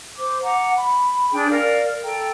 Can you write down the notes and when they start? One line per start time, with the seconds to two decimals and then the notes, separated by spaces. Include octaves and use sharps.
0.19 C5 D6
0.42 F#5 A#5 D6
0.75 B5
1.32 D4 G#4 G5
1.49 A#4 D5 F5
2.03 A4 G5 A#5